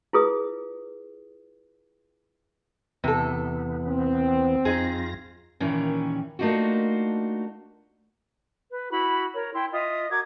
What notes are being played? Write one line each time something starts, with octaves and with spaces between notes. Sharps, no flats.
E4 F4 G#4 B4 D#6
E2 C3 E3 B3 A4
C4
F2 D#4 F4 G#4 A#6
D#2 A#2 D#3 E3 C#4
A3 A#3 D4 D#4 F4 F#4
B4
E4 F#4 B5
A#4 C#5
E4 G5 C6
F4 D#5 E5 D#6
F#4 A#4 D6 G#6